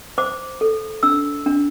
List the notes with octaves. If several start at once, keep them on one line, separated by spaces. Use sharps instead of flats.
C5 D6
A4
D4 E6
D4